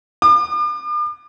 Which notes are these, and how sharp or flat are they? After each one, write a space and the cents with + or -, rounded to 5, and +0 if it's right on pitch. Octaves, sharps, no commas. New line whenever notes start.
D6 +40